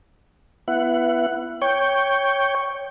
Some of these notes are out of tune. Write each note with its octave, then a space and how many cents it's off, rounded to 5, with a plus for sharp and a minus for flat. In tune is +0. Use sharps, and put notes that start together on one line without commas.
B3 +0 E4 +25 F#5 +0
C#5 +0 G5 +0